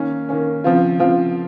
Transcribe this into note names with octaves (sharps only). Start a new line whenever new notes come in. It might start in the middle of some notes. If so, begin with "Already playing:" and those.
Already playing: D#3 A#3 C#4
D#3 A#3 C#4
C#3 F3 C4 F4
C#3 F3 C4 F4